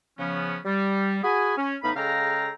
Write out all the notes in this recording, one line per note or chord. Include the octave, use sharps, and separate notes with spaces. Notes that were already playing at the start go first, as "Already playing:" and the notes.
C#3 F3 B3 C#4
G3
F#4 G#4 G#5 B5
C#4
A2 E3 B3 D#4 F5 B5
C#3 G#3 A4 F5 G5 A#5